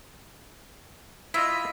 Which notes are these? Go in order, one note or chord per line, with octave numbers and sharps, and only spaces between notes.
E4 F4 D#5 E5